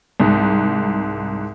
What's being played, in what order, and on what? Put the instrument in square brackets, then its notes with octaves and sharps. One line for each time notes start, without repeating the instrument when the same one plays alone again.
[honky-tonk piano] C2 G#2